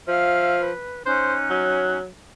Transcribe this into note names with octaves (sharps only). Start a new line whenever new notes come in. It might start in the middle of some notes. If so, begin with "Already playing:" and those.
F3 E5 F5 F6
B4
C#4 D#4 C5 F#6
F#3